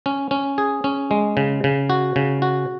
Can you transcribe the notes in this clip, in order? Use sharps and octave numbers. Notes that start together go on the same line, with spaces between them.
C#4
C#4
G#4
C#4
G#3
C#3
C#3
F#4
C#3
F#4